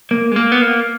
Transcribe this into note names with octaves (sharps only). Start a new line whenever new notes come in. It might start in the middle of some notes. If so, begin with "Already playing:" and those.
A#3
G#3
A#3
B3
A#3